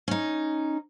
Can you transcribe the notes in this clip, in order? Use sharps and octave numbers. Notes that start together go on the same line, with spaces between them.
C#4 D#4